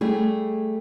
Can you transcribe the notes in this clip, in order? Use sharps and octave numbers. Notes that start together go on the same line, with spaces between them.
G3 A3 G#4